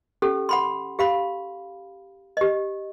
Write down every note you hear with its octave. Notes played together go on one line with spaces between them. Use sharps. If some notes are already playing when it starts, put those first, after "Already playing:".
C#4 G4 A4
F#5 B5 C6
G4 F5 B5
G4 D#5